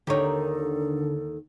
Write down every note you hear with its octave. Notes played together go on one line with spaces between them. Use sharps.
D#2 D3 D#3 G4 A4 A#4 C#5